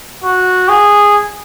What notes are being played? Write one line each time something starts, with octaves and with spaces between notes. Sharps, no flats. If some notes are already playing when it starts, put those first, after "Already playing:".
F#4
G#4